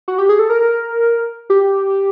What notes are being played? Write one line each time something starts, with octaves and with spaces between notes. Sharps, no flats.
F#4
G4
G#4
A4
A#4
G4